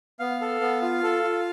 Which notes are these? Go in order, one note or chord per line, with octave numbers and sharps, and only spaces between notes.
B3 F5
A4
B3
F4
A4
F4